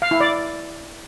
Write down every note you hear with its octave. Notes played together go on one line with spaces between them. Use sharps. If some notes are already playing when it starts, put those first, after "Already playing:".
F5
E4
D5